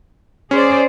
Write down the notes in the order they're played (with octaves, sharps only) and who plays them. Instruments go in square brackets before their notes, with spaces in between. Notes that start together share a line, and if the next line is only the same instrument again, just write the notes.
[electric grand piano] C#4 [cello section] G#4 C5 D5